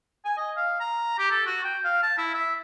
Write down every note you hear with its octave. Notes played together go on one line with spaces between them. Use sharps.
G#5
D#5
F5
A#5
G4
A4
F#4
G5
F5
A5
E4
E5